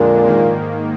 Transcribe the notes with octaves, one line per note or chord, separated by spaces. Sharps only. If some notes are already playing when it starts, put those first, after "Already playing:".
Already playing: F2 A#2 D3 G#3 D4
G#2 D#3 A#3